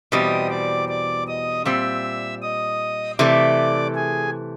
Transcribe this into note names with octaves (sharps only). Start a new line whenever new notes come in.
E2 B2 G3 C4 D#5 D#6
D5 D6
D5 D6
D#5 D#6
A#2 G3 C4 E5 E6
D#5 D#6
C3 E3 A3 D5 D6
G#4 G#5